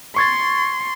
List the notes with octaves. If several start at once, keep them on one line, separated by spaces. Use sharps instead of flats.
C6 C#6 G#6 A6